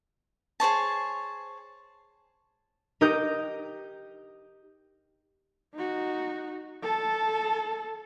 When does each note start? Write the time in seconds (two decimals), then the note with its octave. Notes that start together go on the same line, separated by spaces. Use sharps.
0.60 G#4 C5 C#5 A5
3.01 D#4 G4 A#4 D#6 G6
5.74 D#4 F#4
6.83 A4 A5